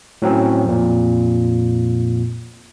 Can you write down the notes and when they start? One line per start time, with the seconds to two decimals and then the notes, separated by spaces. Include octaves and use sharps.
0.22 A2 F#3 C4 C#4
0.65 F2 A#2